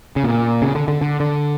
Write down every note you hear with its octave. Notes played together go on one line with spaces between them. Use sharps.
C#3
A#2
C#3
D3
D3
D3
D3